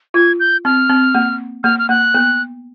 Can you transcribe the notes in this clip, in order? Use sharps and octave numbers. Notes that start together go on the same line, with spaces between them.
F4 G#6
G6
C4 F6
C4
A#3
A#3 F6
F6
A#3 F#6
B3